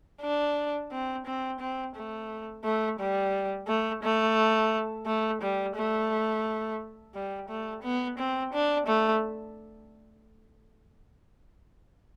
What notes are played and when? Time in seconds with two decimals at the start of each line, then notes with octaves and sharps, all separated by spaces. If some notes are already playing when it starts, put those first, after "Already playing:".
0.22 D4
0.91 C4
1.26 C4
1.60 C4
1.95 A3
2.64 A3
3.00 G3
3.68 A3
4.03 A3
5.06 A3
5.42 G3
5.76 A3
7.14 G3
7.49 A3
7.83 B3
8.18 C4
8.53 D4
8.87 A3